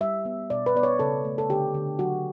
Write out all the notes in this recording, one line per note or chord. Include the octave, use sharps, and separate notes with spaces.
G3 E5
B3
B2 D5
B4
B3 D5
C#5
C#3 A4
A3
A4
D3 G4
D3
F#3 F#4